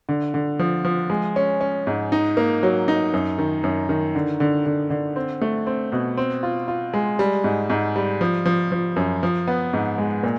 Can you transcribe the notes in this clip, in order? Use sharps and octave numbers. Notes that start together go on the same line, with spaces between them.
D3
D3
F3
F3
G#3
C#4
C#4
G#2
D#4
A#3
F#3
D#4
F#2
D#3
F#2
D#3
D3
D3
D3
D3
C4
A3
C4
B2
C4
F4
F4
G#3
G3
G#2
G#2
G3
F3
F3
F3
F#2
F3
B3
G#2
G#3
A#2